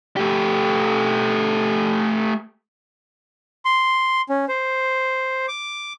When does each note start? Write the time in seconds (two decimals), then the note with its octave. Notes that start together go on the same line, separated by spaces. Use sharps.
0.17 A3 G4
3.65 C6
4.29 C#4
4.48 C5
5.48 D6